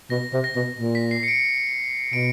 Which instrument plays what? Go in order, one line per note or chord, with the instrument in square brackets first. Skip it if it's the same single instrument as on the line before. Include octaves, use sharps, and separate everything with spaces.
[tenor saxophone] B2 [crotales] A#6
[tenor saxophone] C3
[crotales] A#6
[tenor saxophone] B2
A#2
[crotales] B6
C7
C#7
D7
[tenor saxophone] B2 [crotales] D7